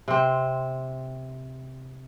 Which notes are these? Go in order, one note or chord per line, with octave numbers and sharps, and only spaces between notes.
C3 C4